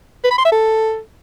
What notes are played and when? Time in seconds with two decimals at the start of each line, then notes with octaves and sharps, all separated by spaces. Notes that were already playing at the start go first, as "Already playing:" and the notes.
0.24 B4
0.31 B5
0.38 C6
0.45 E5
0.52 A4